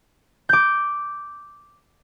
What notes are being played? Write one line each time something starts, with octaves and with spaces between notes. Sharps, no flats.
D6 G6